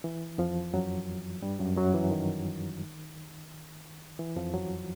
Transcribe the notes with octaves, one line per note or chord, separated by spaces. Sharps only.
E3
F2 F3
F#2 F#3
G2 G3
F#2 F#3
F#2 F#3
E3
D#3
E3
F2 F3
F#2 F#3